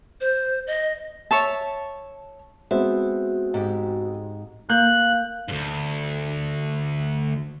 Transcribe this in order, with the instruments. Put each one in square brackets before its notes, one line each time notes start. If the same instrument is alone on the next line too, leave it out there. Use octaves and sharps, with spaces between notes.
[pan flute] C5
D#5
[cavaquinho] C#5 E5 A5
[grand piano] G#3 B3 C4 [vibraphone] F#4 [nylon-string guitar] E5
[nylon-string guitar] G#2 G4
[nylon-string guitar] A#3 [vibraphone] F5 [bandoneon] F#6 [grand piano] G6
[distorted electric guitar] D2 G2